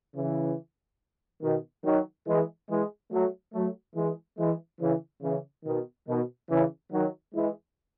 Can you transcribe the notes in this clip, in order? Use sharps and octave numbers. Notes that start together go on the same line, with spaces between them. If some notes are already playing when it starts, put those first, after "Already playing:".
C#3 E3
B2 D#3
D#3 F#3
E3 G#3
E3 G#3
F#3 A3
F#3 A3
E3 G#3
E3 G#3
C#3 E3
C#3 E3
B2 D#3
B2 D#3
C#3 E3
D#3 F#3
E3 G#3